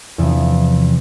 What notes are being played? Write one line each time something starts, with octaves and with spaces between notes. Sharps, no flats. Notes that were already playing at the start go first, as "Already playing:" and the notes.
E2 C3 F3